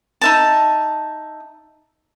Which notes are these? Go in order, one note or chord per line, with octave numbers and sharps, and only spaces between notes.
D#4 E5 A5